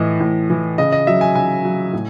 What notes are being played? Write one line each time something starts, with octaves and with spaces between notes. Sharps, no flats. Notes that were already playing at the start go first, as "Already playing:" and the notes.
Already playing: A2 E3 D#5
A2
E3
C#3 D#5
D#5
F#3 E5
G#5
C#3 G#5
F#3
A2